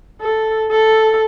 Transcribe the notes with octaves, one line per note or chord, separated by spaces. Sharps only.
A4
A4